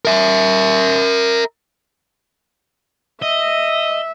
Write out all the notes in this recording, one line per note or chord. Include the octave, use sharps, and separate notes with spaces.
A#4 E5
D#5 E5